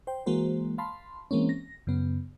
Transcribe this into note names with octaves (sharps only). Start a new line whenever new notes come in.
C5 G5
E3 G#3 A#3 F#4 C5
F5 A5 B5 C6
E3 G#3 A#3 C4 C#4
A#6
F#2 C#3 B3